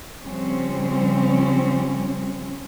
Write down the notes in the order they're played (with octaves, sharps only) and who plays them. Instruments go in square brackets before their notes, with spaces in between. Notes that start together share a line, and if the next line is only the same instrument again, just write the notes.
[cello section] C#3 F3 G3 C4 C#4